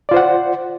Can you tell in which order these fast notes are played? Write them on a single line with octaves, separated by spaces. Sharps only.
D5 F4 C5 F#5